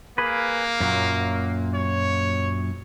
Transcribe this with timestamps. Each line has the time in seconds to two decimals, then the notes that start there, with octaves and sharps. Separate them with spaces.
0.18 A#3 G#4 B4
0.80 F#2 A#2 F#3
1.74 C#5